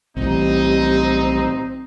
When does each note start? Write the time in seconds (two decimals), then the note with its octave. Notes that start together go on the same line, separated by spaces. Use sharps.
0.16 B1 A2 E3 G3 C4 D#4